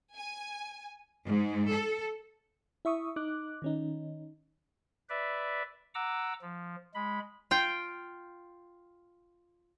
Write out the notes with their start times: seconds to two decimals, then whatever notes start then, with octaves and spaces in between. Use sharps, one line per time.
0.15 G#5
1.26 G#2
1.71 A4
2.85 E4 E5 C#6 D#6
3.16 D#4 D6 F#6
3.62 D#3 C#4 D#4
5.09 B4 D5 E5
5.95 F#5 A#5 D6 E6
6.41 F3
6.94 G#3 B5
7.51 F4 G5